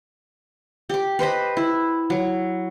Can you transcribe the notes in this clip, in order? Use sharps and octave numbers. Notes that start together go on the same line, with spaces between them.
G4 D6
B4 C5 D#5 B5
E4
F#3